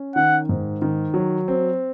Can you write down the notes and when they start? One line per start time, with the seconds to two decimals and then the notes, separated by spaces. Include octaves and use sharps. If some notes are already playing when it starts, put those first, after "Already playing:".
Already playing: C#4
0.16 D#3 F#5
0.49 G#2
0.82 D#3
1.14 F#3
1.48 C4